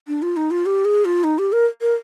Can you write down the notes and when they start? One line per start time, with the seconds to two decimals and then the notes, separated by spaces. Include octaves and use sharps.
0.08 D4
0.22 F4
0.37 D#4
0.51 F4
0.66 G4
0.85 G#4
1.05 F4
1.24 D#4
1.38 G4
1.52 A#4
1.81 A#4